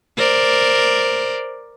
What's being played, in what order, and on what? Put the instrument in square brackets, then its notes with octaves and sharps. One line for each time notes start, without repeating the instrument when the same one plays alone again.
[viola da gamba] A#4 C5 D5